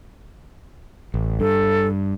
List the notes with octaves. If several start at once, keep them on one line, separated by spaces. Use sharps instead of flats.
A1
G2 A4